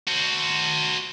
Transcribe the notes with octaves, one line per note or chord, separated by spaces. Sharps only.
F#4 C5